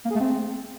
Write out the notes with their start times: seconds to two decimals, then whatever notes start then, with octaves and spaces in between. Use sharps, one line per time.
0.05 A#3
0.10 G#4
0.16 A3
0.21 C4